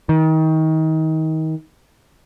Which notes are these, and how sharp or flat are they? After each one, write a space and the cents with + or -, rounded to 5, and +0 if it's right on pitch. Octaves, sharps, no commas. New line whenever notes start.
D#3 +30